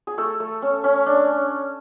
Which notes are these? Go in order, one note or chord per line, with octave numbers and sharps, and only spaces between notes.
G#4
A3 A4
A3
C#4
C#4
D4